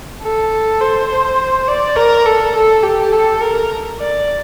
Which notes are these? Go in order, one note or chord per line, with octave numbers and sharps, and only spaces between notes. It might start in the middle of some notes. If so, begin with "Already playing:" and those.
A4
C5
D5
A#4
A4
A4
G4
A4
A#4
D5